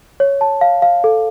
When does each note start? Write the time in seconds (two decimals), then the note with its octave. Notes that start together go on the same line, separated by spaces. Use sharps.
0.20 C#5
0.41 A5
0.61 F5
0.82 F5
1.04 A4